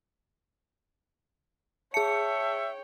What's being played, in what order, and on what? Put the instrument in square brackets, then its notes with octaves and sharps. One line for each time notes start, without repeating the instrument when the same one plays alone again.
[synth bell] G#4 C#7 [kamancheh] C#5 G5 [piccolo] E5 [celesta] A5